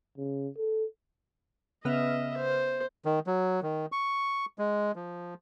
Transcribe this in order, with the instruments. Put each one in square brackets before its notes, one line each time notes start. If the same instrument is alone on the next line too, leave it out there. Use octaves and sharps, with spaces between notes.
[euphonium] C#3
A4
[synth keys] C#3 B3 F6 [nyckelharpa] D#5 E5
[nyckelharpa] C5
[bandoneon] D#3
F#3
D#3
C#6
G#3
F3